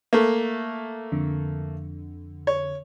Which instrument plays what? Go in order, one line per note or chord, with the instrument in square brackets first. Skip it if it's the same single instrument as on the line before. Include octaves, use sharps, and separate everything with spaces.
[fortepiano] A3 A#3
[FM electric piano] F2 D3
[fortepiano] C#5